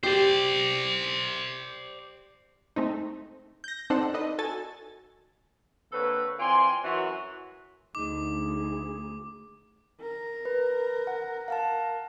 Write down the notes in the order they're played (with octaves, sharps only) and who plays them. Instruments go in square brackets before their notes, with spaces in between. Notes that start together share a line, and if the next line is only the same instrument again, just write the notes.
[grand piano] G4 [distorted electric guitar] C5 D5
[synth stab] G#3 A3 C4 D#4
G6 A#6
C4 D4 D#4 A4 C5 F#5
D#4 A4 B4 D5 D#5
F#4 A4 G#5 A6
[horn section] D3 A#3 C4 A4 B4 C#5
E3 C4 F4 D5 G#5 C6
F#2 E3 F#4
[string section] D2 [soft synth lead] D#4 [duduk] G#4 [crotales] D6
[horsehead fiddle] A#4
[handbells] B4
F#5
F5 F#5 A5